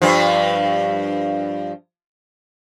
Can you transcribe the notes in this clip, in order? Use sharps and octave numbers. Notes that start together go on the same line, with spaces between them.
G2 F3